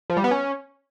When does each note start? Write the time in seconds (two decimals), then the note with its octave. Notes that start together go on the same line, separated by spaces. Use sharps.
0.10 F3
0.17 G3
0.24 B3
0.31 C#4